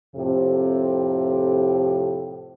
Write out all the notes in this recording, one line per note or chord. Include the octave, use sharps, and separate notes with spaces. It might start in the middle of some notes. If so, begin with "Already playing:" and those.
F2 A2 C3